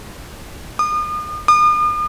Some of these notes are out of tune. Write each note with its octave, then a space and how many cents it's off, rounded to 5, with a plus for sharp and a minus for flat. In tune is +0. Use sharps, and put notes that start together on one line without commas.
D#6 -40
D#6 -45